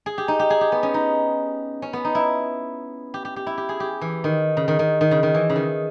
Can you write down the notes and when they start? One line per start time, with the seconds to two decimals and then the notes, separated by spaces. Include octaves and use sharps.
0.06 G#4
0.18 G4
0.28 D#4
0.39 G4
0.50 G#4
0.61 G4
0.72 B3
0.83 C#4
0.94 D#4
1.82 C#4
1.93 B3
2.04 D#4
2.15 E4
3.14 G4
3.25 G4
3.36 G4
3.47 E4
3.58 G4
3.69 G#4
3.80 G4
4.01 E3
4.24 D#3
4.57 C#3
4.68 D#3
4.79 D#3
5.01 D#3
5.11 C#3
5.23 D#3
5.34 E3
5.50 C#3
5.56 D#3